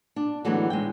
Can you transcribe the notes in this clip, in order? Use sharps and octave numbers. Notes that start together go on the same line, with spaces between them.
D4
D3 E3 F#3 G#3 A3 B3
G#3 G5